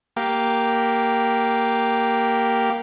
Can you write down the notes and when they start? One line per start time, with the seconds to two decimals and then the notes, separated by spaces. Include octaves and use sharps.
0.16 A#3 G4